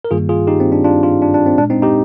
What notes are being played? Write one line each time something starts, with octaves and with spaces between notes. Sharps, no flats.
A#4
G2 D#3 G3 A#3 F4 G#4
F4 G#4
D#4 G4
C4
D4
D4 F4
D4 F4
D4
D4
C4
A#2 G#3 D4
C4 D#4
D#4 G4